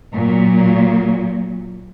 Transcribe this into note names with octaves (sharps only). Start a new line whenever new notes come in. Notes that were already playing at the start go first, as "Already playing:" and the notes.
A#2 F#3